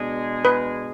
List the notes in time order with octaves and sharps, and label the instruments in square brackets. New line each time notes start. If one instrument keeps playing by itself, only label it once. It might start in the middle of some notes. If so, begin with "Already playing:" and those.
Already playing: [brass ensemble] B2 G#3 D4 G#4
[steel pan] B4